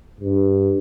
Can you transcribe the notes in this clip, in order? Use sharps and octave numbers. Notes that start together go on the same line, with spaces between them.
G2